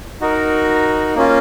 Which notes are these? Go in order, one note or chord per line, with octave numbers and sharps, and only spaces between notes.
D#4 F#4 A#4
A#3 C#4 F4